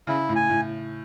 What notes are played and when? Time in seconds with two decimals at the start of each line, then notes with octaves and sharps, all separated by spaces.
0.07 C#3 E4
0.29 A2
0.35 G#5
0.50 A2